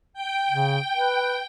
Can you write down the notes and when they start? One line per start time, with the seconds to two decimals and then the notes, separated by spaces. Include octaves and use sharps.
0.14 G5
0.50 C#3
0.96 B4